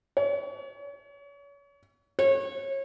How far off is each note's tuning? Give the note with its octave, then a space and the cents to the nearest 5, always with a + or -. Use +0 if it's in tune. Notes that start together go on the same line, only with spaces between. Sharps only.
C#5 +35
C#5 -30